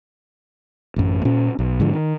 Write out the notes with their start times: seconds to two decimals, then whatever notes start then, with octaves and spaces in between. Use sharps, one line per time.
0.96 A1 F#2
1.25 A#2 C#4
1.59 B1
1.80 G#2 D3 F3
1.93 D#3